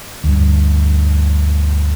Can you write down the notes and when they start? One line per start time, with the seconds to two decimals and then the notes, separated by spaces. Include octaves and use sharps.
0.24 D2 G2